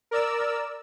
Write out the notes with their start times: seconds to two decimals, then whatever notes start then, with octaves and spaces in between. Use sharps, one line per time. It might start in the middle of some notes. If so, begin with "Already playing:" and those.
0.11 A#4 D5 E6